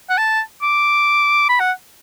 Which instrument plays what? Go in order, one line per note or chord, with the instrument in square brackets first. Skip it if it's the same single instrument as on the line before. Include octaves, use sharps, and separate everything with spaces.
[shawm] F#5
A5
D6
B5
F#5